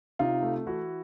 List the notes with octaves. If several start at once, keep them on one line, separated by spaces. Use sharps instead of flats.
C3 D#4 F4
A3
E3 E4 F#4